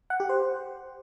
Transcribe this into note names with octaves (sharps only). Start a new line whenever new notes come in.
F#5
G4
C5